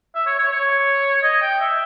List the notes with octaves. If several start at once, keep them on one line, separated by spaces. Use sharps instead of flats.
E5
C#5
C#5
C#5
D#5
G5
E5